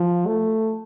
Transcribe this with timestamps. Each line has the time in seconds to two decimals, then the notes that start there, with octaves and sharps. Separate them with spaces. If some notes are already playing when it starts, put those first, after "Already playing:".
Already playing: F3
0.27 A3